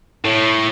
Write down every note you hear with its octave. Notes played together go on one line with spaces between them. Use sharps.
A2